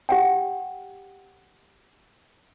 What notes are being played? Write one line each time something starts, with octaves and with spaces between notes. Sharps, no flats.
G4 F#5 G5